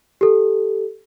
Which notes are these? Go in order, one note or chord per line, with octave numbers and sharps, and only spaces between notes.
G4 A4